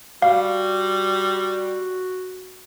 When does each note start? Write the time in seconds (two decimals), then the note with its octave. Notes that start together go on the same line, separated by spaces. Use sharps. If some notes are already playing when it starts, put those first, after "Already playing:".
0.22 G3 F#4 F5